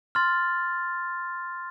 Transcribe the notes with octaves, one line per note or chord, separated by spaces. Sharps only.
C6 F6 A6